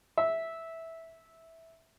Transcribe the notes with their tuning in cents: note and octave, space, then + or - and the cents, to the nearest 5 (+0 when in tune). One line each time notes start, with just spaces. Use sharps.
E5 -10